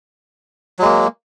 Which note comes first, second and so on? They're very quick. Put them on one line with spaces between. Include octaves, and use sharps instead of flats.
F#3 G#3 A#3